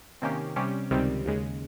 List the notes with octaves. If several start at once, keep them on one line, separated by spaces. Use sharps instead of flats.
C3 D#3 A#3 C#4 G4
C3 G3 C#4 G4
C#2 C3 D#3 G3 C4
D#2 C#3 G#3